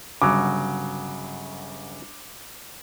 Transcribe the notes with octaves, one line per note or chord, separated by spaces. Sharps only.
G1 C#3 F#3 F#4 D6